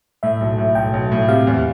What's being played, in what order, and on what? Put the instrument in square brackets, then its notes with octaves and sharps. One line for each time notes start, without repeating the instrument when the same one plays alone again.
[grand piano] A2 [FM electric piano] E5
[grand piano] B1
A2
[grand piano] B1 [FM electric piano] G5
[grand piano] B1
A2
[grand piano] C3 [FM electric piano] F5
[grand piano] E2